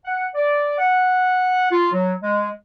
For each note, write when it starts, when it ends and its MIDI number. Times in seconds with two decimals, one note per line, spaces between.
0.05 0.26 78
0.35 0.75 74
0.79 1.70 78
1.71 1.90 65
1.93 2.13 54
2.22 2.49 56